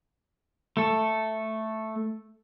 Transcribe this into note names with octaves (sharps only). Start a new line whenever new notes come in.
A3 A4